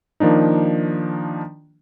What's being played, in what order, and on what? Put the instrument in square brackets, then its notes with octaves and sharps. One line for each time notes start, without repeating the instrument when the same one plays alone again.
[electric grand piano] D#3 F3 A#3 D4 D#4